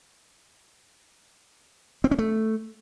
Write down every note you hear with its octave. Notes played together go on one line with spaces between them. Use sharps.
C4
C#4
A3